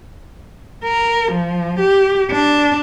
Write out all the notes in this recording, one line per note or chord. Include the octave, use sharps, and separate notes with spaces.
A#4
F3
G4
D4